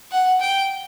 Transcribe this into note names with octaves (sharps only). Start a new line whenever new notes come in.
F#5
G5